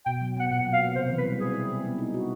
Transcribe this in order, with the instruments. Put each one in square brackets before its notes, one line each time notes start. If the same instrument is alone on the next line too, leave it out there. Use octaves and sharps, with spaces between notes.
[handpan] B2 [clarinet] G5
[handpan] F#3
[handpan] B3 [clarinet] F#5
[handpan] A#2 [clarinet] F#5
[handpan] F#3
[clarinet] F5
[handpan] B3
[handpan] C3 [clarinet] C5
[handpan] E3
[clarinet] B4
[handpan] G3
[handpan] C4 [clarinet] G#4
[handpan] E4
G#4
B3
D#4
F#4